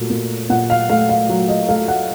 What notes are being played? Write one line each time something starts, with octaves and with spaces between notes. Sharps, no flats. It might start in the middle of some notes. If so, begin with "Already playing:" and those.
Already playing: A#2 F#3 A3
A#2
A#2 F#5
F5
A3 F5
F5
F#3
D#5
A3 F5
F#5